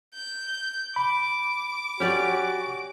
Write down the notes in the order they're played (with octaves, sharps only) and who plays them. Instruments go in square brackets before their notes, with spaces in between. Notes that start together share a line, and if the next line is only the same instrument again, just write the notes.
[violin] G6
[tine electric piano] B5 [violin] D6
[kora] C#4 G4 D5 [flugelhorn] F#4